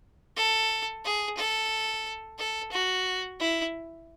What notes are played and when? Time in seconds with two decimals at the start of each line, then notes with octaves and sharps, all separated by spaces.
0.36 A4
1.04 G#4
1.37 A4
2.38 A4
2.72 F#4
3.39 E4